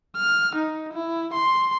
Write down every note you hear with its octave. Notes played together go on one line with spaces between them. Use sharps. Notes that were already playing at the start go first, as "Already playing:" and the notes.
F6
D#4
E4
C6